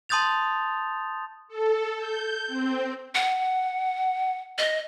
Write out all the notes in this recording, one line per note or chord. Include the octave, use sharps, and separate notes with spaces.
A5 C6 D#6 G6 A6 F7
A4
G6
C4
F#5
D#5